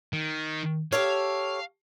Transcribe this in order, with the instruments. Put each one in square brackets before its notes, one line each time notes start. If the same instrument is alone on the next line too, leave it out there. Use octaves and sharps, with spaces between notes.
[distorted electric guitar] D#3
[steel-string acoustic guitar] G4 A4 C#5 [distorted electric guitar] F5